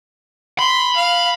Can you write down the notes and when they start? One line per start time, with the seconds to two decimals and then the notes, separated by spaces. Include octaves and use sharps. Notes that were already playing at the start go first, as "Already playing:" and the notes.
0.59 B5 C6
0.96 F5